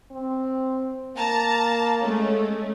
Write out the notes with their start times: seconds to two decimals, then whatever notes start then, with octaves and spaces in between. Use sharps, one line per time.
0.11 C4
1.17 A#3 A5 A#5
2.01 G#3 A3 C#4